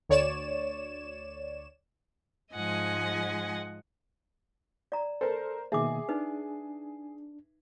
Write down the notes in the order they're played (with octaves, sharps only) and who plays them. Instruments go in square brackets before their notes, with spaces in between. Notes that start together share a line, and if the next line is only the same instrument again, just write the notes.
[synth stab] D2 C#5 D5 E7
[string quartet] G#2 F3 G#3 D#5 F#5 G#5
[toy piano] D5 A#5
[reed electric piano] A4 [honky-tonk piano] A#4 C5
[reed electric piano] B2 D#3 A#3 [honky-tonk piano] G#4 [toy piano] E5 D6
[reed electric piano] D4 [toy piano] D#4 B4